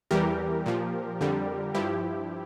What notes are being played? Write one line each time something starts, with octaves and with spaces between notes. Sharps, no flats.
E2 E3 G3 G4 A#4
A#2 F3
F2 D3 G3
G2 F3 E4 G4